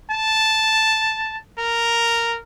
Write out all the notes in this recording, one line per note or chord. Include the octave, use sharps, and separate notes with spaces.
A5
A#4